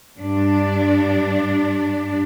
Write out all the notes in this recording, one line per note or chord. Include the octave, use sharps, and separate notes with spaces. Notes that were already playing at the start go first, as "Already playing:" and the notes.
G2 D4